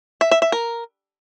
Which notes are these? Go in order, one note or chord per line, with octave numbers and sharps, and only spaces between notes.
E5
E5
E5
A#4